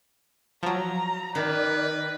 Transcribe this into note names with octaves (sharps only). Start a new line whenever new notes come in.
F3 F#3 A#5
D#3 B4 D5